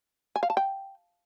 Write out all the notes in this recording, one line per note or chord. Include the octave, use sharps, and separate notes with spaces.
G#5
F5
A5
G5